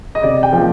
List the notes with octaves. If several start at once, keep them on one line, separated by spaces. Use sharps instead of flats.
D#5
C3 D5
G5
F3 A#3